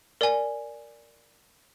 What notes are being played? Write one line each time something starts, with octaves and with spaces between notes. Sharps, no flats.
A#4 D5 G#5